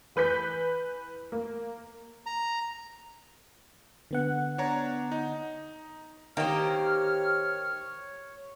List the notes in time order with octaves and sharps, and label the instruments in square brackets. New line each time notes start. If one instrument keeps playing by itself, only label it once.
[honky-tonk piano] E3 B4 G6 B6
A#3
[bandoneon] A#5
[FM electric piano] D3 B3 F#5
[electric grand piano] D4 C#5 A#5
D#4
[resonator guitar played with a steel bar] D#3 A#3 [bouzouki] G4 C5 [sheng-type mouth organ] C#5 [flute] F6